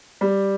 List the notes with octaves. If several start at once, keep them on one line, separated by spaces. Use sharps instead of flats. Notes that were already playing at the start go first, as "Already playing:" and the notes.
G3